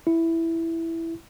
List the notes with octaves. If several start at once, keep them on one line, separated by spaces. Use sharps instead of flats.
E4